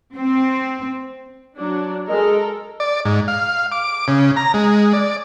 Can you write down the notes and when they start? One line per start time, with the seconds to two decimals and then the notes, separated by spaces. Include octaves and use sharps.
0.17 C4
1.57 F#3 D4
2.08 G#3 A4 A#4
2.80 D5
3.05 G#2
3.28 F5
3.72 D6
4.08 C#3
4.36 A#5
4.54 G#3
4.93 D5